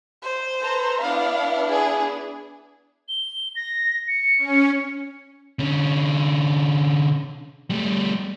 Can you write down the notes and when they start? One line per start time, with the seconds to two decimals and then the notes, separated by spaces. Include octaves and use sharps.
0.23 C5
0.61 A4 B4 A#5
1.01 B3 D4 E4 F5
1.69 G#4
3.08 G7
3.56 A#6
4.08 C#7
4.38 C#4
5.59 D3 C#4
7.70 G3 A3